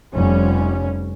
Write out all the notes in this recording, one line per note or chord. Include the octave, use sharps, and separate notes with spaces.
F1 G3 C#4